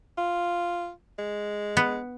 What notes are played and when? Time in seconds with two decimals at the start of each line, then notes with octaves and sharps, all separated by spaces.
0.18 F4
1.19 G#3
1.77 B3